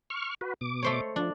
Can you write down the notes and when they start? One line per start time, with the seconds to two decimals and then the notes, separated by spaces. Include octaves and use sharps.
0.10 C#6 F6
0.41 F#4 B4
0.61 B2 D6
0.83 A3 C5 C#5
1.16 F3 D4